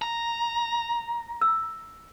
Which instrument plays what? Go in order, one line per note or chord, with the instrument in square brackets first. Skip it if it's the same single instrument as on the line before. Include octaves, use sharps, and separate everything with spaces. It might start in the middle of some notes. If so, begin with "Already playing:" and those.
[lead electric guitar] A#5
[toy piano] E6